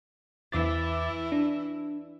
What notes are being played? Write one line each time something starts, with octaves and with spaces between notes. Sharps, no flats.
E2 E3 E4 D6 A6
D4